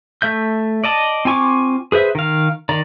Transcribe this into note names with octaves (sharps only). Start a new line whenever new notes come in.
A3 E5 G6
D5 D#5 A5
C4 F4 G#5 C#6 D6
G#4 B4 C5 E5
D#3 F5
D#3 D5 A#5